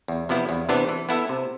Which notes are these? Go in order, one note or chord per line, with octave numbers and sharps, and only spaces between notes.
E2
C3 F3 B3 E4
E2
C3 E3 B3 D4
E3
B3 E4 A4 E5
C3